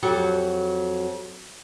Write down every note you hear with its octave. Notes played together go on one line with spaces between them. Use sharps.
F2 F#3 G4